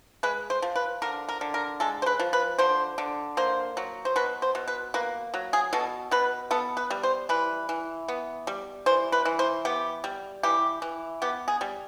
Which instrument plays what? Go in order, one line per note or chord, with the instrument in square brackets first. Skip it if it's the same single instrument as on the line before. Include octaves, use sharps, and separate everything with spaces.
[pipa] G#3 B4
C5
F3
B4
D3 A#4
A#4
D3
A#4
G#3 A4
C5
B4
F3
B4
D3 C5
D3
A#3 C5
F#3
C5
B2 B4
C5
B2
B4
A#3 B4
F#3
G#4
B2 A4
B2 B4
B3 A4
B4
G3
C5
E3 B4
E3
B3
G3
E3 C5
B4
E3
C5
B3 G4
G3
E3 G4
E3
B3 G4
G#4
G3